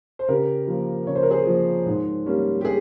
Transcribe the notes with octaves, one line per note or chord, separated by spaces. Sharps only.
C5
C#3 G4 A#4
F3 A#3
C#3 C#5
C5
A#4
G#4 C5
F3 A#3
G#2
G3 A#3 C#4
G4
G#4